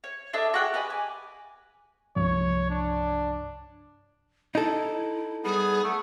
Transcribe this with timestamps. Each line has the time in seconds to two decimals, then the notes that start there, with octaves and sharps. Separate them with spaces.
0.04 C#5
0.33 D4 A4 D#5 E5
0.54 F#4 G#4 F#5 G5
0.74 G4 B4 D#5 G#5
0.90 G#5 D6
2.16 C2 G2 F3 C#5
2.70 D4
4.55 D#4 E4 A4
5.44 G3 B3 G#4
5.84 A3 F#5